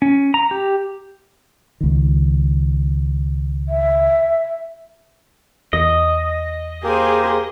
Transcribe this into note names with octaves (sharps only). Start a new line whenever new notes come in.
C#4
A#5
G4
C#2 D#3
E5
E2 D#5
A#3 G4 G#4 A#4 C5